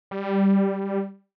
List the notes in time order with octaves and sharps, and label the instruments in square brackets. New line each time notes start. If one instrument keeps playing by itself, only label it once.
[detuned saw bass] G3